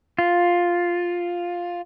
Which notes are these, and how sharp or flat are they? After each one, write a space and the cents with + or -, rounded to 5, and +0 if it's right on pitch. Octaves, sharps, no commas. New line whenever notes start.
F4 +5